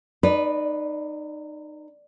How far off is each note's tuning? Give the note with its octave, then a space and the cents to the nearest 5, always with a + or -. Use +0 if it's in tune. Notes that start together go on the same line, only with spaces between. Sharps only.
D#4 -25 B4 +0 D5 +0